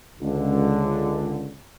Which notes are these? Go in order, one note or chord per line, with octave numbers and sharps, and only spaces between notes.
C#2 D3